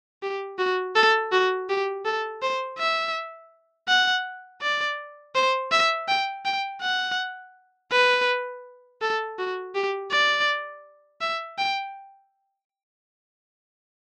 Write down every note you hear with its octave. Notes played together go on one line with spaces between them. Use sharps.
G4
F#4
A4
F#4
G4
A4
C5
E5
F#5
D5
C5
E5
G5
G5
F#5
B4
A4
F#4
G4
D5
E5
G5